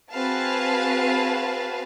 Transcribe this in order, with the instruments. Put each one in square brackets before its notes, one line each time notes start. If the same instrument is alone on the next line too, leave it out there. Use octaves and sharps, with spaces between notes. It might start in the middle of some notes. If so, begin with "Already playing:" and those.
[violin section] C4 F#4 G#4 B4 F5 A5